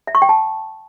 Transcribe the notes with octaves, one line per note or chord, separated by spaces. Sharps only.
E5
C#6
G5
A5